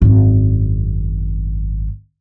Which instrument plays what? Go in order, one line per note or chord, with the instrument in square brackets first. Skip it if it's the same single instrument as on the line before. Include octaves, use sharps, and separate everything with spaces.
[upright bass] G#1 F#2